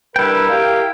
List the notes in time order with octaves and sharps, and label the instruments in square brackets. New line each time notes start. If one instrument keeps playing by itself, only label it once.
[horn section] G3 D4 B4 [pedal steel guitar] E4 G5 [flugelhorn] A#4
[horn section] G4 F5